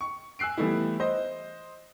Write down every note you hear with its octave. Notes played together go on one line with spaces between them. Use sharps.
C#6
G#5 E6 F#6 C7 D7
E3 G3 A3 B3 E4
C5 D#5